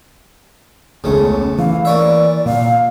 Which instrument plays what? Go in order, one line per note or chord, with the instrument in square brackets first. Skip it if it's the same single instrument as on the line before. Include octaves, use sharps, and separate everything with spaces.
[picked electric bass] E1 C#2 C#4 [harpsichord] C#3 A3
[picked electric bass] E3 [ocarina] F5
[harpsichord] A#3 C#5 E5 [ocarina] D5
[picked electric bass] A#2 [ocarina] F5